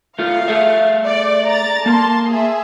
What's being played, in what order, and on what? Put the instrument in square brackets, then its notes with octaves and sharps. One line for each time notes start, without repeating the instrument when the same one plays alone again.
[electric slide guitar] A3 F4 [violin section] F5
[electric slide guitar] A3 G#4 E5
[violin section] D5
A#5 A6
[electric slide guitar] A#3 A#4 [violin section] A5 C6
[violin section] G#4 E5